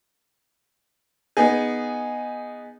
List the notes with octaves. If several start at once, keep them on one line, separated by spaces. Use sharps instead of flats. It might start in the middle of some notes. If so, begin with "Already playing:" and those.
B3 D#4 G#4